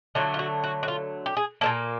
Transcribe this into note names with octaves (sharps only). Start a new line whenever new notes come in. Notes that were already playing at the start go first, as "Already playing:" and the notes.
D3 F#3 A3 F4
F4
F#4
F#4
F#4
F4
G4
G#4
A#2 F#3 A#3 A4